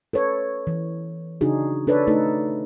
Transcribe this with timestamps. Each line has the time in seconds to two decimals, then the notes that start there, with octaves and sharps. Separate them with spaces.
0.13 A4 B4 C#5
0.67 E3
1.41 C#3 D4 D#4 F#4 G#4
1.87 D4 A4 B4 C#5 D5
2.07 A3 D#4 A4